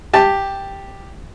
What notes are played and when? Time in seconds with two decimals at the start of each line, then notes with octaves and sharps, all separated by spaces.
0.13 G4 A5